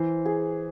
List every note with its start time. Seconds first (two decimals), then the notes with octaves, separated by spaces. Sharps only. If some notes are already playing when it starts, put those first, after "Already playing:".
Already playing: E3 C5
0.26 G#4